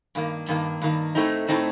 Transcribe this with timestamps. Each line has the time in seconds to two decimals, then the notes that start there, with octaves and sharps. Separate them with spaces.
0.15 G2 D#3 A#3
0.48 G2 D#3 A#3
0.82 G2 D#3 A#3
1.15 A2 A3 C4 D#4
1.49 A2 A3 C4 D#4